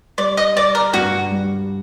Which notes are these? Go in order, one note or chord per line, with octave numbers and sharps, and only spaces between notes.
G3 D5
D#5
G3 D5
A#4
G2 F#4
G3